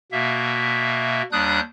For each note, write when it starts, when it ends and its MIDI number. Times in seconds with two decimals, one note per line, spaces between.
0.12 1.22 47
0.12 1.22 58
0.12 1.22 76
1.32 1.60 39
1.32 1.60 55
1.32 1.60 62
1.32 1.60 87
1.32 1.60 90
1.32 1.60 91